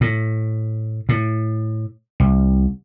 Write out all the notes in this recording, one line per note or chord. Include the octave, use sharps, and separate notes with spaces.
A2
A2
C2